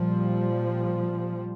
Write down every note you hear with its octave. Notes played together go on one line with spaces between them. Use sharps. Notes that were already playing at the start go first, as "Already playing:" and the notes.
Already playing: A#2 F3 G3